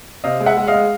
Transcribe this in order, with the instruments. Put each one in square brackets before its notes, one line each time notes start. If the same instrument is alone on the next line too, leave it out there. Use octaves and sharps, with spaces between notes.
[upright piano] C3 D#5 F5
G#3
E5 F#5
G#3
D#5 F5
G#3